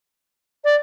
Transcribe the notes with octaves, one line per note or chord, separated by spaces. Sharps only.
D5